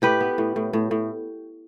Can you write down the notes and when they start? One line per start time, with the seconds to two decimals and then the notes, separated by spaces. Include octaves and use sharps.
0.02 A2 G4 B4
0.20 B3
0.38 A2
0.56 A2
0.73 A2
0.91 A2